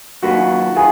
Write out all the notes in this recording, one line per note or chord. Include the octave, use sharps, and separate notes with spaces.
F#2 D#3 A#3 F4 F#4 B4
D#3 F4 G#4 B4